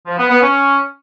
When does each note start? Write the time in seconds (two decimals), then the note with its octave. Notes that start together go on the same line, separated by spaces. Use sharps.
0.07 F3
0.19 B3
0.30 B3
0.42 C#4